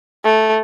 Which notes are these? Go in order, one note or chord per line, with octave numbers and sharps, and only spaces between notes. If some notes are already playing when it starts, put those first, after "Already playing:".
A3